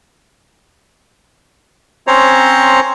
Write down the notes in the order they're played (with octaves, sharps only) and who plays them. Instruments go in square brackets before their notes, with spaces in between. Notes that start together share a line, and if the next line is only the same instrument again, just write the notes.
[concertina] C4 C#4 C5 C#5 A#5